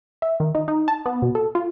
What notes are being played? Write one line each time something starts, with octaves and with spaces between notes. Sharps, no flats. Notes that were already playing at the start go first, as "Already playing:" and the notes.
E5
D#3
D#4
D#4
A5
B3
B2
A4
F4